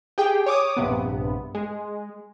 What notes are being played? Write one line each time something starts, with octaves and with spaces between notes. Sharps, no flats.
G4 G#4 G5
C#5 D6 D#6
A#1 G2 C3 B3
G#3